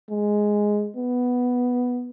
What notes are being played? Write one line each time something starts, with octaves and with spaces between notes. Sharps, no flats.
G#3
B3